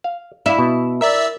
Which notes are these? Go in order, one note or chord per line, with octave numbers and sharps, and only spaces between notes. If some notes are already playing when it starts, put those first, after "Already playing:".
F5
E4 D5 F5
B2
A#4 D5 E5 E6